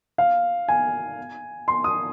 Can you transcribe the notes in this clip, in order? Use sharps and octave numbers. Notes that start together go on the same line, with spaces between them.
F5
G#5
C6
D#6